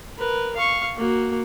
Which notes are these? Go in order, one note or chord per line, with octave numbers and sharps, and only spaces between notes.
A#4 B4
F5 C#6
A#3 F#4